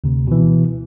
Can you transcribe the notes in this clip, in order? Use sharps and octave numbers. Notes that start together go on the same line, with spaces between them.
D2 C3
B2 E3